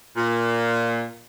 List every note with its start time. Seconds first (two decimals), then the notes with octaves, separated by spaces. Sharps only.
0.17 A#2